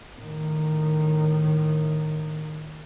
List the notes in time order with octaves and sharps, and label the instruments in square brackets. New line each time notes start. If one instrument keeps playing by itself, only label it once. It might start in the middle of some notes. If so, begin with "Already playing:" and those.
[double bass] A2 D#3